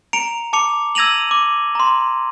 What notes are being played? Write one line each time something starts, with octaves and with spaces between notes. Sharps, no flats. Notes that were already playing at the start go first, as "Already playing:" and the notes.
A#5 C#7 D7 F7
A5 D6 C#7 F7
E6 G#6 A#6 D#7 F7 F#7
D6
A#5 C6